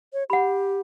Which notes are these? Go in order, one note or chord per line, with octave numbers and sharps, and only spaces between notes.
C#5
G4 F#5 B5